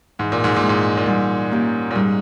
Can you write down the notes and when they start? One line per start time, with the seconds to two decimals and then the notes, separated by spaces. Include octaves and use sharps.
0.19 G#2 E3
0.32 A#2
0.44 G#2
0.56 A#2
0.63 G#3 E4 G#4
0.69 G#2
0.97 A#2
1.07 G#2 G3
1.52 A#3 C#4 G4
1.91 A#2
1.95 G#2 G3